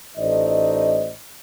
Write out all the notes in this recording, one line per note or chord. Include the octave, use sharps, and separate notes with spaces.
A1 A3 D#4 C5 D5 D#5